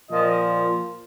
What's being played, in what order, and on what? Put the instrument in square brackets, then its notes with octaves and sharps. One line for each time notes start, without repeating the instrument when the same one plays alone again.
[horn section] A#2 F3 A#3 D#5